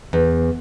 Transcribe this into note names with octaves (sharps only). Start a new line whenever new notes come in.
E2